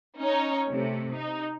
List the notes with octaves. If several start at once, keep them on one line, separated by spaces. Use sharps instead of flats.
C#4 D#4 C#5
C3 A3
D#4